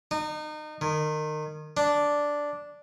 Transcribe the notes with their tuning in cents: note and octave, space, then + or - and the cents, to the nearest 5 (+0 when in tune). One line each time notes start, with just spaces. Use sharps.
D#4 -30
D#3 -25
D4 -5